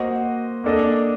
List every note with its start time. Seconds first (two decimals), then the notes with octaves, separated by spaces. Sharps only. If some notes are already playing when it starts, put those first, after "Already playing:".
Already playing: A#3 F#4 C5 D#5
0.64 A#3 D4 A4 D#5